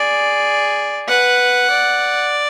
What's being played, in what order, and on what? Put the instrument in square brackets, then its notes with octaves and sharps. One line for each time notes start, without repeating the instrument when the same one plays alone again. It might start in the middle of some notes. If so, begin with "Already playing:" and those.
Already playing: [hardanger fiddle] G#4 [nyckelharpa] D5
[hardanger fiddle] B4 [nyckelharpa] F#5
[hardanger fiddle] D5